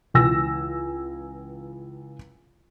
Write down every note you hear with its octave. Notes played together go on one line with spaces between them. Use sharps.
C#2 E3 G#5 E6 A#6